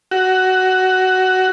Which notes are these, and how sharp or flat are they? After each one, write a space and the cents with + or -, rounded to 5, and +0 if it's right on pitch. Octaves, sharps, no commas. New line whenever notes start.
F#4 +10